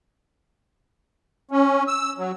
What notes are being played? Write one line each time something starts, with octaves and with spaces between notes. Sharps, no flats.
C#4
E6
F#3